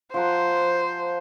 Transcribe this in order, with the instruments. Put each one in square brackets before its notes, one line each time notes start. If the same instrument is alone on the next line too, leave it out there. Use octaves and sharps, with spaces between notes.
[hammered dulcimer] F3 F#5 A#5 [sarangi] C5